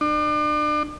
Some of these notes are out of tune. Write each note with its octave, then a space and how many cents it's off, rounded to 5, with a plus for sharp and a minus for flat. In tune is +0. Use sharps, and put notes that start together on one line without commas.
D4 +40